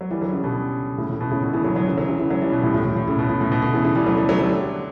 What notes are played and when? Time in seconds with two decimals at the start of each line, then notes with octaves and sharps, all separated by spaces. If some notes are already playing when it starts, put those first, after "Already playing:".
0.01 F#3
0.11 E3 G3
0.21 D3 F#3
0.32 C#3 E3
0.44 B2 D3
0.98 A2 C#3
1.09 A2
1.21 B2
1.31 A2 C#3
1.43 B2 D3
1.53 C#3 E3
1.65 D3 F#3
1.75 D3 F#3
1.87 C#3 E3
1.97 D3 F#3
2.08 C#3 E3
2.20 C#3 E3
2.31 F#3 A3
2.42 E3 G3
2.52 B2
2.63 A2
2.74 A2
2.85 A2
2.96 A2
3.08 A2 C#3
3.19 B2
3.29 A2
3.41 A2
3.52 B2
3.62 B2 D3
3.74 C#3 E3
3.85 C#3 E3
3.96 E3 G3
4.06 F#3 A3
4.18 E3 G3
4.29 F#3 A3
4.39 D3 F#3